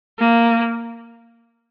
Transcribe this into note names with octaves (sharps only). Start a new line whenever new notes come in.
A#3